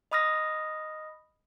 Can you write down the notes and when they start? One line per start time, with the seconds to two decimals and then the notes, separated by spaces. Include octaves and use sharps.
0.11 D#5 B5 D#6 F6 A#6